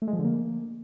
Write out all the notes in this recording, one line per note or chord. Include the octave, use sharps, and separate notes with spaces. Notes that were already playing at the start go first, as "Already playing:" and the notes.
A3
G#3
F3
D3
A#3